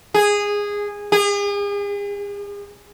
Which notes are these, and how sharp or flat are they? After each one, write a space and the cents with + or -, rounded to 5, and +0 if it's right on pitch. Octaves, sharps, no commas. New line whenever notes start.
G#4 -15
G#4 -40